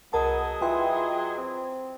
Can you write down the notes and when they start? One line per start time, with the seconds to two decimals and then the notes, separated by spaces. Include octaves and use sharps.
0.13 C2 F#3 B3 G#4 A#4 D#5 A5
0.62 E3 F4 G5 C6
1.38 C4